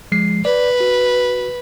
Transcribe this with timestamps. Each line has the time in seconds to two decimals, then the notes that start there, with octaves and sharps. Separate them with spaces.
0.12 F3 G#3 C7
0.45 B4 D5
0.80 F#4